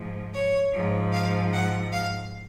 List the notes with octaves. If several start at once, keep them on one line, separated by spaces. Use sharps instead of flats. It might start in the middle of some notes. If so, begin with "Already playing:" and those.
Already playing: G#2 F3
C#5
G#2 F3
F5
F#5
F5